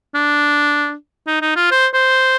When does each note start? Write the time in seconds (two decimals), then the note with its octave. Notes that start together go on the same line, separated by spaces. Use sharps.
0.15 D4
1.27 D#4
1.41 D#4
1.56 F4
1.71 C5
1.94 C5